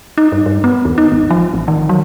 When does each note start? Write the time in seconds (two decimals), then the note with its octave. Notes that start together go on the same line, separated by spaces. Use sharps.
0.18 D#4
0.32 G2
0.46 G2
0.64 B3
0.85 D#2
0.98 D#4
1.12 G#1
1.30 F3
1.53 A1
1.68 D#3
1.89 F#3